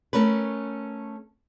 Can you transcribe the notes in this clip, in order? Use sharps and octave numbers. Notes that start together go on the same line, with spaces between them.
A3 C#4 A#4 B4